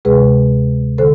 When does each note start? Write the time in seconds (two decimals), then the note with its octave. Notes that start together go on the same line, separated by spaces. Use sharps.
0.05 D2 C3 G#3 G#4 B4
0.98 D3 A4 C5